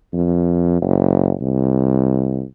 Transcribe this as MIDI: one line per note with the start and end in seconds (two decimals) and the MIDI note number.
0.13 0.81 41
0.81 1.33 30
1.41 2.44 36